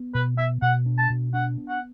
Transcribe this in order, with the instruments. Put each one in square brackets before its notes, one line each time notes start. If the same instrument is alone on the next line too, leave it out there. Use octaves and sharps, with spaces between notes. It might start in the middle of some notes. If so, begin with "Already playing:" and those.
Already playing: [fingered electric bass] B3
[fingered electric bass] B2 [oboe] B4
[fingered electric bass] B3 [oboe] E5
[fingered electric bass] B2 [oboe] F#5
[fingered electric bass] D4
[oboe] A5
[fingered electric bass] B2
[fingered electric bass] D4 [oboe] F#5
[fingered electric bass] B3
[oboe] F#5